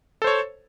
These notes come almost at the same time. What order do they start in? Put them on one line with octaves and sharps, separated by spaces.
A4 C5 C#5